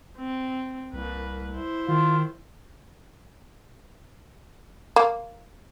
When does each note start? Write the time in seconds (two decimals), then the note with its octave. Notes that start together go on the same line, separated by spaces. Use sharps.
0.17 C4
0.94 C2 A#3 B4
1.52 E4 C5
1.89 D#3 F4
4.96 A#3